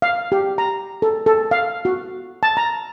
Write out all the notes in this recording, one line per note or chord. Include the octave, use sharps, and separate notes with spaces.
F5
G4
A#5
A4
A4
F5
F#4
A5
A#5